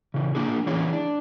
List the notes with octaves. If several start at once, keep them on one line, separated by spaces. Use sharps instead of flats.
C#3 E3
A#3 D4 F4 G#4
E3 C#4 E4 G#4 C#5
D4